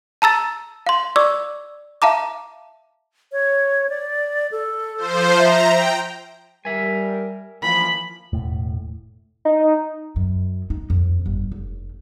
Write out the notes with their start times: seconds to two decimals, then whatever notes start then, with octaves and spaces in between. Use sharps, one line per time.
0.22 A5 A#5 E6 A6
0.87 F5 C6
1.16 D5 C#6 D6 E6
2.02 E5 F5 A5 A#5 D6
3.32 C#5
3.89 D5
4.51 A4
4.97 F3 C5
5.38 E5 A#5
5.69 G5
6.65 G3 A#4 E5 G#5
7.63 E3 F3 A#3 B5
8.33 E1 A2
9.45 D#4
10.16 F#2
10.70 D#4
10.90 F2
11.26 G1
11.52 F1